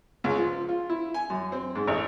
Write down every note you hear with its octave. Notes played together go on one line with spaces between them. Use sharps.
C#2
F3
F4
E4
G#5
F#2
C4
G#2
A1